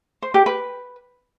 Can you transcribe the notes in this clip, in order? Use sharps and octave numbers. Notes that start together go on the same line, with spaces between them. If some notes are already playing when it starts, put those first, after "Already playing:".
C5
G4
B4